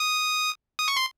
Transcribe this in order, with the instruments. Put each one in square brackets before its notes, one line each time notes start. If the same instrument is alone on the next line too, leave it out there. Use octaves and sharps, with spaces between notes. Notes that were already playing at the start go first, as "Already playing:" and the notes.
Already playing: [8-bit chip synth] D#6
D#6
C#6
C6